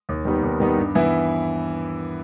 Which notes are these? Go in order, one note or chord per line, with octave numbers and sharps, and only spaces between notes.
D#2
D#3 G3 B3 D#4
D#2
D#3 G3 B3 D#4
G2
E3 B3 E4